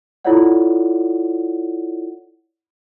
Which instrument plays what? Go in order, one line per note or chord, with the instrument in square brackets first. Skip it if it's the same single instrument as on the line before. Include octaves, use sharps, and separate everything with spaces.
[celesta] E4 F4 A4 C#5 D5 F#5